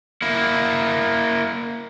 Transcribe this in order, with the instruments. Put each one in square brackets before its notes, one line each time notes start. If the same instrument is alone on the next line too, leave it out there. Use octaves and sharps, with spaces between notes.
[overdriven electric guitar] A#3 E4